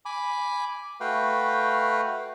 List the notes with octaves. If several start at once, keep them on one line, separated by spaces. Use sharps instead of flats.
G#5 B5 D6
A3 F#4 B4 F5 G5